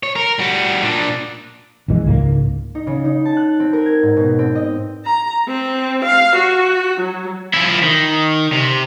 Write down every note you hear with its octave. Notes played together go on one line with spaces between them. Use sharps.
C#5
A#4
G3 F#4
A#2 D4
A#1 F#2 E3 G#3
C#2 G#2 A3 A#3
D#4
C#3
D#4
A5
F#6
C4
A#4
G#6
G#2
B2
C4
D#5
A#5
C4
F5
F#4
F#3
F3 E4
D#3
C3